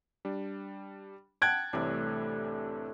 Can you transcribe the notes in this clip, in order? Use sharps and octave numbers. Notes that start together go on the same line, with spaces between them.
G3 D4
F#5 G5 A5 F#6 G#6 D7
C2 A2 C3 E3 D4